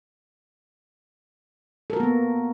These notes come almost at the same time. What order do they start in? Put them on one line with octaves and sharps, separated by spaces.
A4 A#4 F#4 A#3 B3